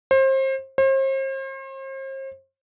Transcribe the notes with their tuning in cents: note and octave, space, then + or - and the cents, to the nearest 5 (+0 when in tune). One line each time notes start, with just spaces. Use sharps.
C5 +30
C5 +40